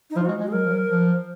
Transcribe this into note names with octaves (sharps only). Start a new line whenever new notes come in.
D#4
F3 F4
F#4
G#3
G#3
F#4
G#4
F#3 A#4
F3
F#3
F3